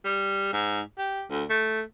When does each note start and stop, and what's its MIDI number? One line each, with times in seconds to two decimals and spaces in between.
0.04 0.51 55
0.53 0.81 44
0.98 1.23 67
1.30 1.44 38
1.49 1.82 57